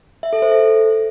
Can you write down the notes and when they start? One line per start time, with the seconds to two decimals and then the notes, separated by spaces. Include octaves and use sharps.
0.23 E5
0.33 A4
0.42 C5
0.52 A4